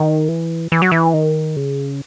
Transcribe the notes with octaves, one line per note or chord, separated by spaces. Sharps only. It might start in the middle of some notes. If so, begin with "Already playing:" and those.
Already playing: D#3
E3
E3
F#3
E3
D#3
C#3